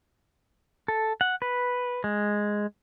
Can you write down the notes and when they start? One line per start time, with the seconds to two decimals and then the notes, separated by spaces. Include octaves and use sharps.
0.88 A4
1.21 F#5
1.42 B4
2.04 G#3